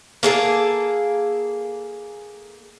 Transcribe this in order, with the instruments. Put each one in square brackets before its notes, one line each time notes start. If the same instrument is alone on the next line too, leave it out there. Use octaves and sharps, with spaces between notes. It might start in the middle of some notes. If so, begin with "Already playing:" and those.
[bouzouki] A#3 G#4 A4